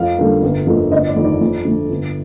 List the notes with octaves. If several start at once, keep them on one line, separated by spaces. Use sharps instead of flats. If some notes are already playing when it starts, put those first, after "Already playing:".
Already playing: F2 F5
D3 G3 A#3
G1
F2 D3 F3 A#3
G1 D#5
D5
F2 D#3
D5
F2
D3 F3 A3
G1